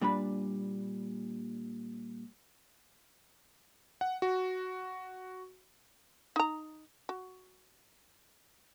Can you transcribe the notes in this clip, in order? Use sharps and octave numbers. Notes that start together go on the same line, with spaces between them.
A#2 G3 D4 B4 B5
F#5
F#4
D#4 A#5
F#4